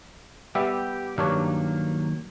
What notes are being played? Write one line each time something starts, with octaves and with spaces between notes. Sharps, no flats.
G3 B3 G4 E5
G2 D#3 F#3 A#3 D4 C#5